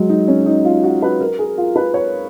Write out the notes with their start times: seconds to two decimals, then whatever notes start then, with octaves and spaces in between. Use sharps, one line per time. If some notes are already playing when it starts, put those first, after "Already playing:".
Already playing: F#3 G#3
0.09 D#4
0.28 C#4
0.46 D#4
0.65 F4
0.83 F#4
1.02 B4
1.20 A#4
1.39 G#4
1.58 F4
1.76 B4
1.94 C#5